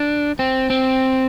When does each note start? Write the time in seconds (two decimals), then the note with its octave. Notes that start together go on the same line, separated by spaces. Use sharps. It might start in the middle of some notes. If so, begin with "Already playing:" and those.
Already playing: D4
0.39 C4
0.70 C4